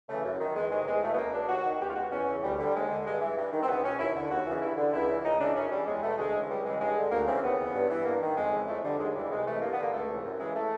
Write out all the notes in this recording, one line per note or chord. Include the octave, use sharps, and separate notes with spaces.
C#3 E3 A3
F#2
D#3
E2 G#3
C3 D#3 G#3
E2 G#3
B2 A3
B3
C#2 A#3
B2 D4
D#2 F#4
D#3
C#2 G4
F4
B2 F#4
E2 C#4
C#3 E3
D2 G3
D3 G3
D#2 G#3
D3
G2 G#3
E3
G2
D#3
C4
C#2 B3
B2 C#4
D#2 E4
D3
D#2 F#4
C#3 E3
G2 E4
D3
C#2 E4
C#3 E3
C#2 D#4
C#3 E3 D4
F#2 C#4
C#3 E3 G3
E2 G#3
B2 A3
D2 G#3
C#3 E3
C#2 G3
C#3 E3 G#3
G2 G#3
D3
D2 A#3
C#3 E3 C4
D#2 B3
C#3 E3
G2
E3
G2 A#3
D#3
F2 G#3
C#3 E3
F2 A3
D3 G3
D#2 G#3
C#3 E3 G3
C2 G#3
C3 E3 A3
G2 A#3
B3
D3
A#3
C#2 A3
C3 E3
F#2
C#3 E3 G#3
A3